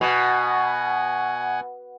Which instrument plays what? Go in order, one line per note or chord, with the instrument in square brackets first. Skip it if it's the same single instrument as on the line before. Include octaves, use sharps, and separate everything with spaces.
[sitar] B2 [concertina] F#5 G#5